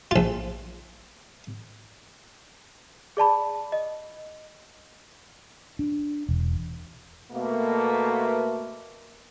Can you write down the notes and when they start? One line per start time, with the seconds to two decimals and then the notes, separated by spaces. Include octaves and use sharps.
0.11 A#1 F4
3.17 G#4 D5 A5 B5
3.72 D#5
5.79 D4
6.29 E1
7.32 B2 A3 A#3